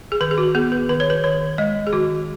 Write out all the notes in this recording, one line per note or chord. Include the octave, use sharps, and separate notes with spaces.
G#4
D#3 B4
G#4
F#4
B3 G#4
B4
D#3 B4
C#5
B4
D#3 C#5
G#3 D#5
G#4
D#3 F#4